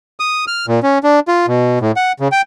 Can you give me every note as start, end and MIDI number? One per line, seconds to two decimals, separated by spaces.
0.20 0.45 87
0.47 0.66 89
0.68 0.80 46
0.83 0.98 61
1.04 1.20 62
1.28 1.46 65
1.48 1.79 47
1.81 1.92 45
1.96 2.12 78
2.20 2.28 49
2.32 2.42 79